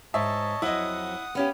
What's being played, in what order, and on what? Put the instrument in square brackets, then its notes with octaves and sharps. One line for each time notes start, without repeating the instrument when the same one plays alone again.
[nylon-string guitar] G#2 [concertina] C#5 D#5 A5 [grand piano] E5
[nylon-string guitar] F2 F#3 [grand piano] E4 D#5 [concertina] F#5 D#6
[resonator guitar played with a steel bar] B3 C#4 G4 [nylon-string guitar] F5 F#5